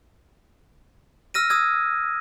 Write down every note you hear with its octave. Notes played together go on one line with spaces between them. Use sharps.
E6 F6 A#6 D#7
D#6 E6 G#6